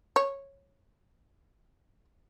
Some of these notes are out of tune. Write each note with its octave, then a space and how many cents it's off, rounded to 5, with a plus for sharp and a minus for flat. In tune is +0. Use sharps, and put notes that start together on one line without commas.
C#5 -10